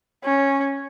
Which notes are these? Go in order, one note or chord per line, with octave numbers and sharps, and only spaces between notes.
C#4